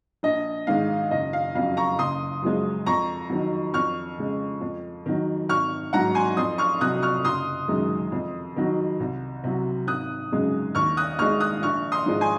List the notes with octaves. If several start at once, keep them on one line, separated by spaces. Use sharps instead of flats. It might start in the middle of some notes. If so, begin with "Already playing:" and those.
A#1 D#5
G#2 D#3 G#3 F5
F#1 D#5
F5
F2 C#3 F#3 F5
A#5 C#6
F#1 C6 D#6
F#2 F3 G#3
F2 A#5 C#6
D#3 F#3
F2 C#6 F6
C#3 G#3
F2
D#3 F#3
G#1 C#6 F6
G#2 F#3 F#5 A#5
G#5 C6
F2 C6 D#6
C#6 F6
C3 F#3 D#6 F#6
C#6 F6
F#1 C6 D#6
F#2 D#3 G#3
F2
D#3 F#3
C2
C3 F#3
G#1 D#6 F#6
F#2 C#3 G#3
D#2 C#6 F6
D#6 F#6
D#3 G#3 C#6 F6
D#6 F#6
A#1 C#6 F6
C6 D#6
G#2 F3 G#3
G#5 C6